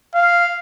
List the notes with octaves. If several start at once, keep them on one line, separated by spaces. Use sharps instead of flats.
F5